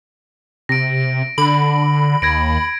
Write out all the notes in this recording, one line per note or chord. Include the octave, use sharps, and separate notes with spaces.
C3 A#6 D7
D3 B5
D#2 G#6 A#6 D7